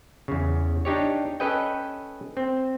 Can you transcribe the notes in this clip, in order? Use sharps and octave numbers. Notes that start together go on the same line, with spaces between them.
E2 C#3
D4 D#4 G4 C#5
C#4 A4 B4 D#5 G5
C4